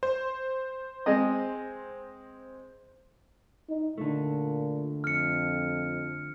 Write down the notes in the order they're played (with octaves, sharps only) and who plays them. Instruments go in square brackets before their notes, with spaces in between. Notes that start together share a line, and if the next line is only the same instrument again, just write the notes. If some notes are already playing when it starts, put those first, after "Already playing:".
[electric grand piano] C5
[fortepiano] G#3 C4 D#5
[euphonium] D#4
[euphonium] A#2 [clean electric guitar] D3 A3
[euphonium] F2 [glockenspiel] F6 C#7